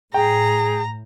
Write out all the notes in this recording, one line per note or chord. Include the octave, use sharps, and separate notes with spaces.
A2 G#4 G5 A#5